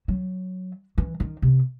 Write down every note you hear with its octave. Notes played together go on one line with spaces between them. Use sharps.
F#3
E3
D#3
C3